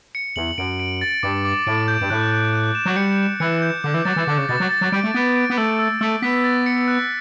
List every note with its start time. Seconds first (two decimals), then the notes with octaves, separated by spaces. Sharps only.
0.15 C#7
0.36 E2 F#7
0.58 F#2 D7
0.80 D7
1.01 A6
1.23 G2 D6
1.45 D6
1.67 A2 D7
1.88 G6
2.01 G2
2.10 A2 F#6
2.31 F#6
2.53 F#6
2.75 E7
2.85 F#3
2.96 G3 C#7
3.18 E7
3.40 E3 C#7
3.62 G6
3.84 D3 D6
3.94 E3
4.05 F#3 A6
4.16 E3
4.27 D3 D6
4.38 C#3
4.49 B2 A6
4.60 F#3
4.71 A6
4.81 F#3
4.92 G3 D7
5.04 A3
5.14 B3 D7
5.36 D7
5.50 B3
5.57 A3 E6
5.79 E6
6.01 A3 E6
6.22 B3 B6
6.44 A6
6.66 C#7
6.88 F#6